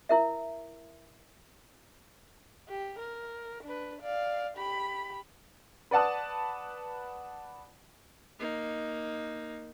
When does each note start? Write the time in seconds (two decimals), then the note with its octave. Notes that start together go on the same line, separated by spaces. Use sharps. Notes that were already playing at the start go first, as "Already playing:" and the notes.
0.09 E4 A#4 E5
2.68 G4
2.99 A#4
3.63 D4 B4
4.01 D5 F5
4.57 G4 B5
5.91 B4 D5 F#5 A5 D#6
8.39 A#3 D#4